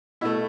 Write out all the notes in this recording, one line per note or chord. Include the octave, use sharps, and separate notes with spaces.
B2 A3 E4